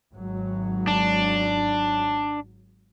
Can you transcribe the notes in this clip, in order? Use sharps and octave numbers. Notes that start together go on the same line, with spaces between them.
G#1 F#3
D4